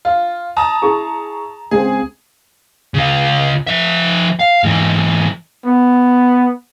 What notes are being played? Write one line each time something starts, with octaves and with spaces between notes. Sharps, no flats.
F4
A5 A#5 D#6
E4 G#4 C#6
C#2 C4 G#4
C#3 F4
F3 E5
F5
G#2 E3
B3